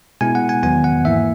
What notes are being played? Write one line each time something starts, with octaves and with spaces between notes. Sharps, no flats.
B2 G#3 B3 E4 G#5
F#5
G#5
E2 D#3 F#3 B3 G#5
F#5
G#2 E3 A#3 E4 E5